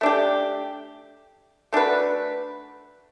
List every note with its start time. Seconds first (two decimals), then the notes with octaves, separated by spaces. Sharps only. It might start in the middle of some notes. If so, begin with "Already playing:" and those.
0.01 A3 D4 G4
1.73 A3 D4 F#4 B4